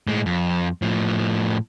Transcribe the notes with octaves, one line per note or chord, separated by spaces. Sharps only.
A2 G#3
F2
A2 F3